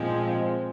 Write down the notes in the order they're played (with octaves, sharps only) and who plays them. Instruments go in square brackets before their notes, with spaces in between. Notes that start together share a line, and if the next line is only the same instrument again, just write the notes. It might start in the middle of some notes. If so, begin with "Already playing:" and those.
Already playing: [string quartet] A#2 F3 G#3 C4